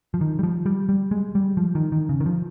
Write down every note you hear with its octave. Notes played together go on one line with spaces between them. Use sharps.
F3
D#3
G3
F3
G3
G3
G#3
G3
F3
D#3
D#3
C#3
D#3
F3